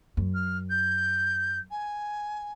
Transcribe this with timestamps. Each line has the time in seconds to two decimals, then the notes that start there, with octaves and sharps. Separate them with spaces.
0.17 F#2
0.34 F6
0.69 G6
1.70 G#5